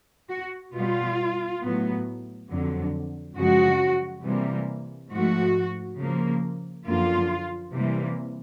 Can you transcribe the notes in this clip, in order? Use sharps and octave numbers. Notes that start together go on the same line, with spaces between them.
F#4
B2 G3 B3 F4
A2 F#3 B3
F2 D3 F#3
F#2 C#3 F3 G#3 F#4
C3 E3 G3 A#3
G#2 F3 A3 F#4
C#3 F3 A#3
F#2 D3 F3 A#3 F4
C3 E3 G3 A#3